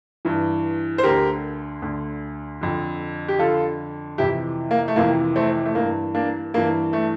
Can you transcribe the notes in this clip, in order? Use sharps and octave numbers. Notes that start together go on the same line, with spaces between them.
G2 E3
C5
D2 D3 G4 A#4
D2 D3
F2 D3
G4
F2 D3 F4 A4
F2 C3 E3 E4 G4
A#3
A3
F2 C3 E3 A#3
A3 C4
A3
G2 E3 A#3
A#3 D4
G2 E3 A#3
A3